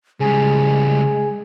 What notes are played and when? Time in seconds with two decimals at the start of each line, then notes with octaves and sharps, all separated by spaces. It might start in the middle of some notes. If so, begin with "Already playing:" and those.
0.20 C#3 G3 G#3 G#4